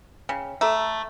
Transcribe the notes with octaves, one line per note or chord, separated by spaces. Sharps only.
C#3 G5
A3 A4 A#5